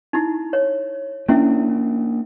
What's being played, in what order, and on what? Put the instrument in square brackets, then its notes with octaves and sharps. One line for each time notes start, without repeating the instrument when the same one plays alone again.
[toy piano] D#4 E4
C#5
[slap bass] A#3 D4 [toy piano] C#4 E4 E5